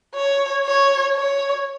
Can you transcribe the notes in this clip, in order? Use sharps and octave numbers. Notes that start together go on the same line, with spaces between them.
C#5
C#5
C#5